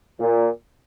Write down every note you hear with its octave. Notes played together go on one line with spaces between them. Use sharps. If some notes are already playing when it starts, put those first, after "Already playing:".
A#2